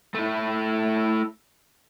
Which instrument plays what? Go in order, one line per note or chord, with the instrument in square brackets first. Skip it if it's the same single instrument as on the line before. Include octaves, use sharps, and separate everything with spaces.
[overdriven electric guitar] A3 E4